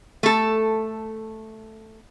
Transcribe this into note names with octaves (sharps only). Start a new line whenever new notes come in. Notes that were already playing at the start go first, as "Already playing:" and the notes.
A3 A4